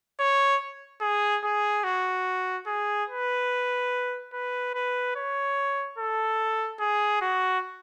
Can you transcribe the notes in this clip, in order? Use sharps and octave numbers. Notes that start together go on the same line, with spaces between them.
C#5
G#4
G#4
F#4
G#4
B4
B4
B4
C#5
A4
G#4
F#4